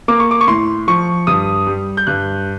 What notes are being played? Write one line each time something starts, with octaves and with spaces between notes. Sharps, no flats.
A#3 D6
C#6
D6
C#6
A2 C6
F3 C#6
G2 D#6
G3
G6
G2 F#6